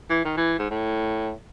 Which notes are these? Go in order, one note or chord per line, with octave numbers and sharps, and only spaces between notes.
E3
D#3
E3
G#2
A2